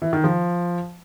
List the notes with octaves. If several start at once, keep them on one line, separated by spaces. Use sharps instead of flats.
E3
D#3
F3